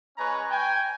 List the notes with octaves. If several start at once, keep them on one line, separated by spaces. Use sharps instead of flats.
G#3 C#4 B4 C#5 G#5 A#5
G5 G#5